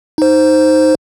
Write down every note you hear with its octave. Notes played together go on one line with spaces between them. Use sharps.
D#4 C5